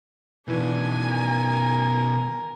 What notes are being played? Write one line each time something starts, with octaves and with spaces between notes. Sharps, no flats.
B2 D#3 E3 D4 G#5
A#4